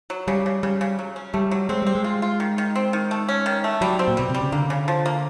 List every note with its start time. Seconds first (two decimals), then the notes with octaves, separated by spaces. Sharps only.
0.10 F#3
0.27 C#3 G3
0.46 C#3
0.63 C#3 G3
0.81 C#3
0.99 F#3
1.16 C#4
1.34 G3 A3
1.51 F#3
1.69 G#3 C4
1.82 G3 C4
1.95 G#3
2.04 F4
2.22 F4
2.40 D#3
2.58 D#3
2.75 C4
2.93 D#3
3.11 A3
3.28 C#4
3.46 D#3
3.64 A3
3.81 F#3 G3
3.99 C4
4.08 A#2
4.17 B2 G3
4.30 C3 G3
4.41 C#3
4.52 D3 A#3
4.70 C#3
4.88 F3
5.06 A#3